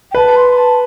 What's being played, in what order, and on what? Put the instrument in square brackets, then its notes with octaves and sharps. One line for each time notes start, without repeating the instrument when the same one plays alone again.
[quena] G5
[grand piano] B4 [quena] A5
[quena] C6
A5